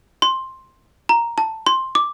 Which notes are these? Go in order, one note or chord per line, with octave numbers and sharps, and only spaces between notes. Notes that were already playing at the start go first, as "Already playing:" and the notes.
C6
A#5
A5
C6
D6